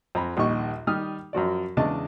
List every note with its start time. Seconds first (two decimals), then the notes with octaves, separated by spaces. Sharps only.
0.15 F2 A#5 B5
0.37 A#1 D#2 D#3 G3 D#5 C#6
0.87 D#3 G3 G4 D#6 F6
1.33 F#2 F3 F#4 D5
1.77 E2 C#3 G#3 D4 D#5 A5